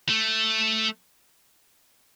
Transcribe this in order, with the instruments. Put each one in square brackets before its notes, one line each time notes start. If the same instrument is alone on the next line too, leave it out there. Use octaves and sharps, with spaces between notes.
[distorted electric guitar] A3